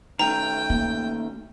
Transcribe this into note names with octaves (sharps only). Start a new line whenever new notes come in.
D#3 A3 C#4 G5 A#5
A#3